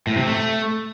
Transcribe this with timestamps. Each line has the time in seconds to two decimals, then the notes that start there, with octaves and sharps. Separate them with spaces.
0.07 A2
0.17 C3
0.27 A3